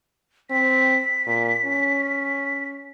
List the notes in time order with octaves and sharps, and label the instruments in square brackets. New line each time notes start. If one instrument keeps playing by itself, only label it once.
[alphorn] C4 [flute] B6
[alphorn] A#2
C#4